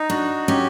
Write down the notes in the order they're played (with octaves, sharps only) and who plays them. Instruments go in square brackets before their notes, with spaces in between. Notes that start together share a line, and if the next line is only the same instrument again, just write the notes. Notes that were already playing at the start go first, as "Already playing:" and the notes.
Already playing: [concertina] D#4
[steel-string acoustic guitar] D4 [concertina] F#4
[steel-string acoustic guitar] C#4 [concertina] G4